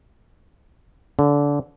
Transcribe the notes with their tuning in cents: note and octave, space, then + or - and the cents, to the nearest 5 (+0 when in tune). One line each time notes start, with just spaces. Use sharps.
D3 -25